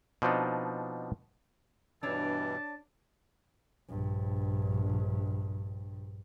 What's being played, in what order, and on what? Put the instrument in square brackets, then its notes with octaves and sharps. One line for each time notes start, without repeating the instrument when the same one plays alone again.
[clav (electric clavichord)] B2 F3 C4 D4 D#4
[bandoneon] G2 B2 E3 [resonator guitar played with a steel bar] D4 C#5 [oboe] A5
[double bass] A#1 G2